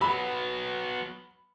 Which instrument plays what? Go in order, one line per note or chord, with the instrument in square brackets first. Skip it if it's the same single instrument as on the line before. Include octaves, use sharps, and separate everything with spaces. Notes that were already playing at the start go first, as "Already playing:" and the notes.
[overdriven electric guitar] F#3 B3 [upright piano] B5